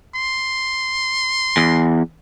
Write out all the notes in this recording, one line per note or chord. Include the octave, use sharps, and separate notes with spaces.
C6
E2